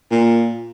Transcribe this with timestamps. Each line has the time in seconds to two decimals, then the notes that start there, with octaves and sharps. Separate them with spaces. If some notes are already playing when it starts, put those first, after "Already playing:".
0.11 A#2